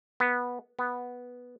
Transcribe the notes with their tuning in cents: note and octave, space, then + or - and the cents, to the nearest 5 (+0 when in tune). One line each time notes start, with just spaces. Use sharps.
B3 -10
B3 -5